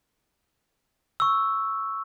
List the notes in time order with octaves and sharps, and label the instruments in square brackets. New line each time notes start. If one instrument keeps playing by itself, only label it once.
[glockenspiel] C#6 E6